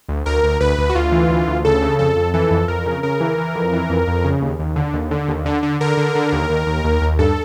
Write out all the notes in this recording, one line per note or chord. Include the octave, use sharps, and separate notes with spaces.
D2
D2 A#4
D2
D2 B4
D2
F#4
D2 F4
E3
D2
D2
C#3 A4
C#3
F2 A4
F2
E3 A4
F2
F2 A#4
C#3
C#3 A#4
E3
E3
F2
E3
F2
F2
C#3
D#2
D#2
D3
D#2
D3
D#2
D3
D3
D3 A#4
D3
D3
D#2
D#2
D#2
D#2
D#2
G2 A4